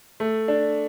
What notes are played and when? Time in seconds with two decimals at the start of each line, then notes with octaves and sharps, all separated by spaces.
0.20 A3
0.48 D4